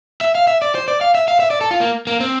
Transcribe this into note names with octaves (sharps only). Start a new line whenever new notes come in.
E5
F5
E5
D5
C5
D5
F5
E5
F5
E5
D5
A4
F4
A#3
A#3
C4